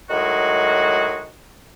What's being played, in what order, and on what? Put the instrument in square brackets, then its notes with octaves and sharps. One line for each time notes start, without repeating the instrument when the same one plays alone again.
[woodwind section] A2 D#3 F#3 G#3 F#4